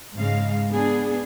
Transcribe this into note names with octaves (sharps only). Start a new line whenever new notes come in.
G#2 C#3 G#3 F5
B3 D4 G#4